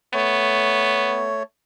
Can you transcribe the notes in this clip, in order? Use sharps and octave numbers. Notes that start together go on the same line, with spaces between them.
A3 B3 C#5